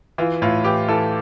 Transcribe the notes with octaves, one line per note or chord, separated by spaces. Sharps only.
E3 F4
A2 F4
E3 G4
E3 A4